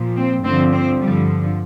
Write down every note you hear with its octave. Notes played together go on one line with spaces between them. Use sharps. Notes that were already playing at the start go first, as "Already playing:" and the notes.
Already playing: A#2 F3
C4
G2 D3 F3 C4
C4
G2 D3 F3 G3